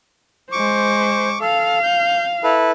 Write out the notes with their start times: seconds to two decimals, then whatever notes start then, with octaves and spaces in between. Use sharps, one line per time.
0.52 G#3 C5 C#6 D6
1.41 A4 F5
1.83 G6
2.44 E4 A4 B4